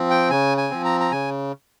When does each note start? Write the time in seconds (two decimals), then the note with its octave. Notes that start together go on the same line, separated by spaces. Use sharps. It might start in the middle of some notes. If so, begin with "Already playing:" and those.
Already playing: F3 C4
0.10 G5
0.30 C#3 G#5
0.58 G#5
0.71 F3 C4
0.85 A#5
1.01 A#5
1.11 C#3 G#5